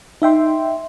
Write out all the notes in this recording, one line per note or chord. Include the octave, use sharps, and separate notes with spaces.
D#4 E5 G5 C6